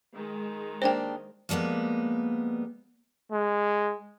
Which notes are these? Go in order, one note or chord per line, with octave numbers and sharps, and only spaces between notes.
D#3 G#3
A#3 D4 G4 C5 G5
F3 G3 G#3 A#3 B3
G#3